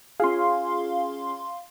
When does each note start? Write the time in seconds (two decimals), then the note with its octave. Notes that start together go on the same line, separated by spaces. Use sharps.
0.20 C#4 F4 G#4 F5 C6